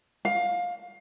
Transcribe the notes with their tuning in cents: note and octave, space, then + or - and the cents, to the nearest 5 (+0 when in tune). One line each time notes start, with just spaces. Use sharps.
F5 +20